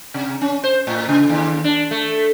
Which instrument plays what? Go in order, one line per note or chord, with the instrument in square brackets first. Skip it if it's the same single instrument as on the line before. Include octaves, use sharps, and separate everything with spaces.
[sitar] C3
C#4
C5
A2
C#3
D#2
D4
A3